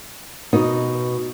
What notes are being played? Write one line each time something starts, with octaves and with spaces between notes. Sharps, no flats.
B2 D#4